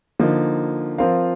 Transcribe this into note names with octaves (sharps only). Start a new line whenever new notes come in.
D3 F3 A#3 D#4
F3 C4 F4 A#4 F5